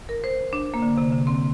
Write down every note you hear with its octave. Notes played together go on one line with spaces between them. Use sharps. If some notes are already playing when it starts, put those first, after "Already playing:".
A#4
C5
D4
A#3
D3
C3
D3
C4